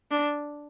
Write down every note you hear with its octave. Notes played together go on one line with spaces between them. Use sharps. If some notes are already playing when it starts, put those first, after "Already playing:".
D4